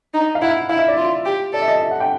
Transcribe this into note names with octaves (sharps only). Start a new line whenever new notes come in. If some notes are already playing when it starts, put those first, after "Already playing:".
D#4
F5
E4 F#5
E4 F5
E5
D5
F4
G4
A4 D5
E5
D#5
E5
F#5
G5